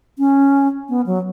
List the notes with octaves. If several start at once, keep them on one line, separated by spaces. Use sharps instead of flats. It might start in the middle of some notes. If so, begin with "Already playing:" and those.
C#4
B3
F#3